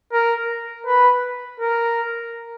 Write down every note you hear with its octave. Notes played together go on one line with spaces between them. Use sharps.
A#4
B4
A#4